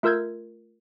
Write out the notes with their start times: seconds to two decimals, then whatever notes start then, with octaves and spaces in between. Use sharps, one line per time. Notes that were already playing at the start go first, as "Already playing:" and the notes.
0.03 A3 F4 A#4 E6 G6 G#6